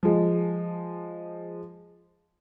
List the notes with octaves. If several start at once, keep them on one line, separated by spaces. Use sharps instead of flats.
F3 G#3